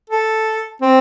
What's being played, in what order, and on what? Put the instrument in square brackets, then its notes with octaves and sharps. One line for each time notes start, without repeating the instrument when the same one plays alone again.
[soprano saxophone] A4
C4